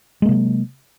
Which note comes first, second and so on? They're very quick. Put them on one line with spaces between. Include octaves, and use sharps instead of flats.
G#3 A#3 C3 F#3